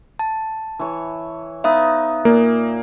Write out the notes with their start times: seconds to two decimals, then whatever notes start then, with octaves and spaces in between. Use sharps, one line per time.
0.19 A5
0.79 E3 C#5
1.64 B3 D#4 E5 F5 D#6
2.25 A#2 A#3